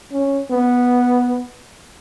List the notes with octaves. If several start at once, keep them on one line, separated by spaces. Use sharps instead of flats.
C#4
B3